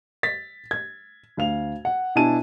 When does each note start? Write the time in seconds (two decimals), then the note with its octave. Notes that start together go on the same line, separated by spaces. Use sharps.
0.23 A6 B6
0.71 G#6
1.37 D2 F5 F7
1.85 F#5
2.15 B2 D4 E4 G#5 A5 D#7